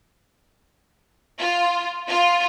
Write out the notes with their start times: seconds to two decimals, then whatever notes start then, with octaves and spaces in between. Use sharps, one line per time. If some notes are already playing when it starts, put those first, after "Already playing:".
1.39 F4
2.09 F4